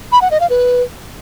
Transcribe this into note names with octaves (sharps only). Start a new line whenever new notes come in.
B5
F#5
D#5
F5
B4